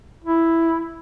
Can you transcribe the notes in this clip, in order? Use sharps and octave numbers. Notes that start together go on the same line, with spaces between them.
E4